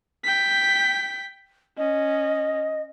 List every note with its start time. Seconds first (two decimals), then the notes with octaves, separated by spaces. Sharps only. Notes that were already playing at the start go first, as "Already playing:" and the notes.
0.24 G5 B6
1.78 C#4 D#5